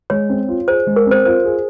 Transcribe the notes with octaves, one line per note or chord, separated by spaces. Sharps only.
G#3 C#5
C4
F4
G#4 C5
G#3
A#4
C4 C5
F4 C5
G#4